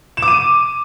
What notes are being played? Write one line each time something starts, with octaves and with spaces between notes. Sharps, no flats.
E7
D6
D#7